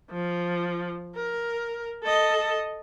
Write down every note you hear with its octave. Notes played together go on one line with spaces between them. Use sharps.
F3
A#4
A4 D#5